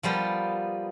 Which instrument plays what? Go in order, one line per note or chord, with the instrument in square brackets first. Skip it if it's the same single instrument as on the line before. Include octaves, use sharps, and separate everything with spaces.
[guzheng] F3 G3 A#3 B3